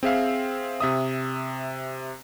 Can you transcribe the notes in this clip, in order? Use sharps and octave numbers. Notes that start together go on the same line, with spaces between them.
C4 G#4 E5 F5
C3 E5 D#6